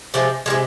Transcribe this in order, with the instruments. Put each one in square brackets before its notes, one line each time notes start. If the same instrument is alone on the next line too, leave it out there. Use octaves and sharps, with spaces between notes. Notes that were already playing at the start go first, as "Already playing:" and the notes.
[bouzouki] C3 F3 G#3
F3 G#3
C3